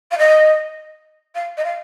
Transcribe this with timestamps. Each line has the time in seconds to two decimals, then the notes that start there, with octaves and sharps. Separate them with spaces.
0.11 F5
0.18 D#5
1.35 F5
1.57 D#5
1.64 F5